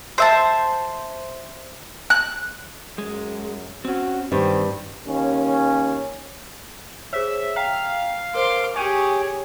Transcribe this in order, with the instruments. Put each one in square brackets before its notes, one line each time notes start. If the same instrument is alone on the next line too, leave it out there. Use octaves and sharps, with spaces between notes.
[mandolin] C5 E5 A5
F#6
[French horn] F#2 [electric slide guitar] G#3
[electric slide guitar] C4 C#4 [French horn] F#4
[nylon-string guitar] G2 [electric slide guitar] D#3 [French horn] C4
[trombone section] D#2 C#4
[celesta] G#4 C5 C#5 [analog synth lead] E5
[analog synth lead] F5 [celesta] G5 A#5 B6
[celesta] A#4 C5 [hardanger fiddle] C6 D6
[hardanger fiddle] G4 G#4 [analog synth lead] C#5 [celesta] G#5 D#7